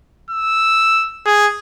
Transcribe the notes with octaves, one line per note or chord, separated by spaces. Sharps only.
E6
G#4